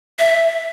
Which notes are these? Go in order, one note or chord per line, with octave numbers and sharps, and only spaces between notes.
E5